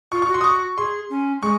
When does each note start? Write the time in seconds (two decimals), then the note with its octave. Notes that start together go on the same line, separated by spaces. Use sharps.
0.12 F4 C#6
0.22 C#6
0.29 F#4
0.34 C6
0.41 D#6
0.44 C#6
0.77 G#4 C6
1.10 C#4
1.42 G#3 C#6